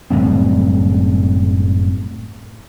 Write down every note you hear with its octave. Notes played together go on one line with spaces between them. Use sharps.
F#1 A2 G3 C4